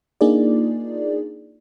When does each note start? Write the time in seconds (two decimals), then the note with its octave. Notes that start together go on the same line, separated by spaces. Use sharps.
0.21 A#3 D4 D#4 F4 G#4 D5